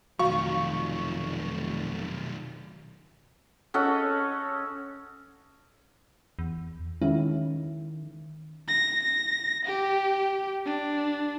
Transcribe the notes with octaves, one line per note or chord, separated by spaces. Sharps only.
F1 B1 D#3 F#4 F5 C#6
C#4 A4 D#5 F#5
E2
D#3 G#3 C#4 E4
A#6
A#6
G4
D4